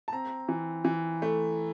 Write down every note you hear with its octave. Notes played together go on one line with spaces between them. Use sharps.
A5
C4 A#5
E3
E3
A3